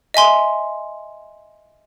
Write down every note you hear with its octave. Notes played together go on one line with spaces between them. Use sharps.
D#5 E5 G#5 C6